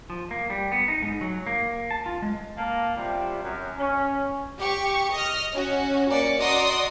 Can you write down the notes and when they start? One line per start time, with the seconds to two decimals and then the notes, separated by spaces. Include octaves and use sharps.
0.10 F3
0.31 A#3
0.50 G3
0.72 B3
0.88 D#4
1.02 G#2
1.21 F#3
1.47 A#3
1.91 A5
2.06 F4
2.22 G#3
2.57 A#3 A5
2.96 C3 G3 F4
3.42 F#2
3.78 C#4
4.59 G4 C#6
5.14 D#5 F6
5.53 C#4 F#4
6.10 A#3 C#4 D5 C#7
6.40 F#4 D5 D#5 A#5 C6 D#6